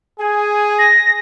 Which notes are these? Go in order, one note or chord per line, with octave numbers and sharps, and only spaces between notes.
G#4 G#5
A#6